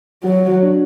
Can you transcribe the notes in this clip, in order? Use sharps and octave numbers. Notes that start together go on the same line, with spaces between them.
F#3 F#4
D4